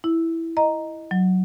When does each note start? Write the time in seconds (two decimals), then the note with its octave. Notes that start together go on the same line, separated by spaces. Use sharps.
0.04 E4
0.57 D#5 A#5
1.11 F#3